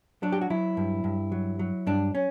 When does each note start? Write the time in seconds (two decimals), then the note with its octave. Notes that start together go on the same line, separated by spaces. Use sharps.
0.23 F#3 D4
0.32 G4
0.41 F#4
0.50 F#3 E4
0.77 G2
1.04 G2
1.32 F#3
1.59 F#3
1.87 G2 D4
2.15 C#4